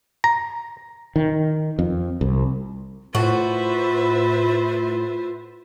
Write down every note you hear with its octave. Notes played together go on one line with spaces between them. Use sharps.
A#5
D#3
F2
C2
A2 F4 F#4 B4 C5 E5